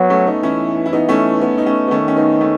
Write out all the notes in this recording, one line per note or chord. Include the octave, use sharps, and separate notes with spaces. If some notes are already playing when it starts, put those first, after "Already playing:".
Already playing: F#3 B3
A3 C#4
B3 D#4
E3 C#4 E4
E4
B3 D#4
A3 C#4
B3
D#4
A3 C#4
B3
D#3 A3 C#4
C#4
B3 D#4
A3 C#4